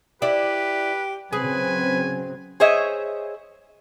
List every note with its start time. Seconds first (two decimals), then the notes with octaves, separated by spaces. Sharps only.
0.22 E4 G4 B4 D5
1.33 C#3 F#3 C4 G#4 B4 G#5
2.60 G#4 C5 C#5 D#5 E5